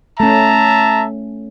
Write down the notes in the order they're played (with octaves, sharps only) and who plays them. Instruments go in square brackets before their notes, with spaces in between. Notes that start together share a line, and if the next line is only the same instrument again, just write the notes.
[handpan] A3 C#4 [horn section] E5 A5 A#5